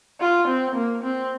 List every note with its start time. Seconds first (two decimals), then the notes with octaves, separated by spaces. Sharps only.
0.20 F4
0.48 C4
0.76 A#3
1.03 C4